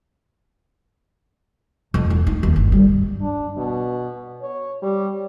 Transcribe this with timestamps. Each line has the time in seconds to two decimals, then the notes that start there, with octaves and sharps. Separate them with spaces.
1.94 F2
2.10 E2
2.27 D#4
2.43 D#2
2.56 G1
2.72 G3
3.21 D4
3.57 B2
4.42 C#5
4.83 G3